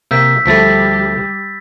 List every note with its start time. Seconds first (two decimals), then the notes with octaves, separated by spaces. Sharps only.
0.11 C3 A#3 E6 G6 B6
0.46 D2 F3 G3 A3 B5 A6 B6